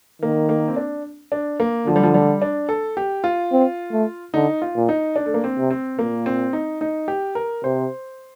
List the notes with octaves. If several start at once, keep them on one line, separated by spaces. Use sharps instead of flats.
D#3 A#3
A#3
C4
D4
D4
A#3
D3 F3
G3
F3
G3
D4
A4
G4
F4
C4
A3
D3 D#4
F4
A#2
D#4
D4
A3
A#3
C4
C3
C4
A#2 A#3
C4
D#4
D#4
G4
A#4
C3 C5